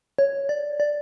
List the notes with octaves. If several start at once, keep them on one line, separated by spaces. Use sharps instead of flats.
C#5
D5
D5